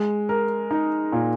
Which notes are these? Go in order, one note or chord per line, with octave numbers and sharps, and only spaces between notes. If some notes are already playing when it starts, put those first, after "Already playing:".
Already playing: G#3
A#4
D#4
A#2